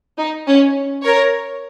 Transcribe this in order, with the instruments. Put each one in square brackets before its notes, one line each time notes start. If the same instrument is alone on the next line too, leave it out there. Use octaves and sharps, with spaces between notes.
[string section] D#4
C#4
A#4 C#5